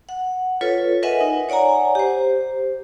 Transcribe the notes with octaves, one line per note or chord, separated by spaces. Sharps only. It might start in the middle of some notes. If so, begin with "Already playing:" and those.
F#5
F4 A4 B4 C#5
A#4 B4 D#5 E5 F#5 G#5
D#4
C#5 D5 F#5 G#5 A#5
G4 C5